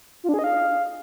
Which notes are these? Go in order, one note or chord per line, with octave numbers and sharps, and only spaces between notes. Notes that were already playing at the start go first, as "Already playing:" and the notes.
F4
D4
G#4
D#5
F5